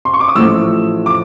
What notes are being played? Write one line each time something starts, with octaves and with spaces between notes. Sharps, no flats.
C6
C#6
D6
D#6
A1 A2 F3 A3 E6
D6